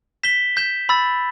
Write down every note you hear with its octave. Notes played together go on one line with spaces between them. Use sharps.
G6 B6 E7 G7
G6 B6 E7 G7
B5 E6 A6